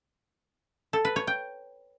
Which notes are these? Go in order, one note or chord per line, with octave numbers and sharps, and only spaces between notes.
A4
B4
C#5
G5